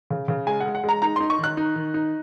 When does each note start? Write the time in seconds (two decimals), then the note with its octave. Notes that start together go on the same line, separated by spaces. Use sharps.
0.10 C#3
0.28 C#3
0.47 G#3 G#5
0.60 F#5
0.66 G#3
0.75 F#5
0.84 G#3 A#5
1.02 D#4 A#5
1.16 D#4 C6
1.30 C#6
1.38 D#3
1.44 F#6
1.57 D#4
1.76 D#3
1.94 D#4